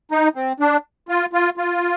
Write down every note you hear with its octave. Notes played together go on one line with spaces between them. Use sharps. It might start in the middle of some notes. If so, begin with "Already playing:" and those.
D#4
C4
D4
F4
F4
F4